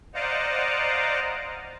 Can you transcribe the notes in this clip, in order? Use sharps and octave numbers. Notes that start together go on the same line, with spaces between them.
C5 D5 D#5 F5 F#5 A#5